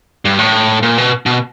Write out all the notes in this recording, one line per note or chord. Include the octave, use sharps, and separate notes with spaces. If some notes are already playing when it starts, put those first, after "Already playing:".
G2
A2
A#2
B2
B2